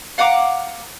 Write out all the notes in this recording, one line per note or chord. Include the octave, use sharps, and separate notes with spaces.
F5 F#5 A#5 D6